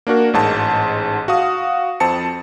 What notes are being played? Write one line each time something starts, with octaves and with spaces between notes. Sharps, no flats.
A#3 D4 F#4 A#4
A1 G#2 A5
F#4 F5 D#6
F2 C4 A5 C#7